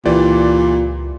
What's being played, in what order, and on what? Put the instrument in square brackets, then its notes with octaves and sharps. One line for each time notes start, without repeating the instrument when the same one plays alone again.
[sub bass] C#2 [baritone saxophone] A#2 [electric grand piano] E3 G4 D5